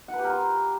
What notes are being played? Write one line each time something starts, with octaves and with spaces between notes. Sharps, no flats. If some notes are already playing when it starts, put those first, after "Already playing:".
F#5
B4
G4
A#4
F4